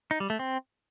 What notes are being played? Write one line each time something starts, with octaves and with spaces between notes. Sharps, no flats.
D#4
G3
A3
C4